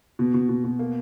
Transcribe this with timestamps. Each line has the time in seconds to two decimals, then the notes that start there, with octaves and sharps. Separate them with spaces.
0.19 B2
0.34 B2
0.49 B2
0.64 B2
0.79 A#3